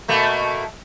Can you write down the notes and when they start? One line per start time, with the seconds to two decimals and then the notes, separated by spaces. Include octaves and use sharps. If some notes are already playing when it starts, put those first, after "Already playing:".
0.08 B2 A3 A#3